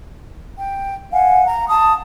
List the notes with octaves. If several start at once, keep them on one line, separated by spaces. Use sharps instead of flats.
G5
F5 F#5 G#5
A#5
A5 D#6